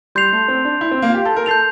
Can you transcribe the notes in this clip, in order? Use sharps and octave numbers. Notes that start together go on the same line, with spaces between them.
G3 C6 G6 C7 F7
A3
C4
D4
E4
C4
A#3
F4
G4
A4
A#4
A4 G6 C7 F7